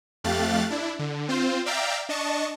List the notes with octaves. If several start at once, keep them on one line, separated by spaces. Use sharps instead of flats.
F2 A3 G4 F5 F#6 A6
D4 E4
D3
C4 F4 C5
D5 E5 F5 G5 A#5
D4 D#5 A5 C#6